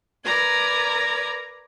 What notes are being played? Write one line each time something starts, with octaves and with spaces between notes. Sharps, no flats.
A#4 B4 D5 A#5 G#6